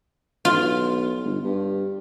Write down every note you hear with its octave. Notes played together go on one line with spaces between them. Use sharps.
B1 F4
G1
G2